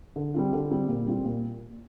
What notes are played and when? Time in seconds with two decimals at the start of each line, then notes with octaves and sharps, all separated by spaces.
0.16 D3
0.34 G3 C4 F4
0.53 D3
0.71 G3 C4 F4
0.88 A#2
1.06 G3 C4 F4
1.25 A#2